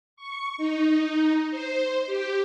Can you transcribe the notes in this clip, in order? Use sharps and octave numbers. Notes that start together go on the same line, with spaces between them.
C#6
D#4
C5
G4